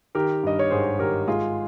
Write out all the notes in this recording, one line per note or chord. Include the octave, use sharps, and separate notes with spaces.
D#3 G4 A#4
G2 D#5
C#5
G#1 G#4 C5
G#1 G4 A#4
G#3 F4 G#4